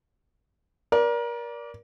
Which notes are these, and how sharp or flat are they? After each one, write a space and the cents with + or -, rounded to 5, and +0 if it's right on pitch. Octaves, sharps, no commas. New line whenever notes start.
A#4 +30 D5 -15